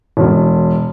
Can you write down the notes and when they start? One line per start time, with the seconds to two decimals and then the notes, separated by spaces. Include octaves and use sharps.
0.17 E1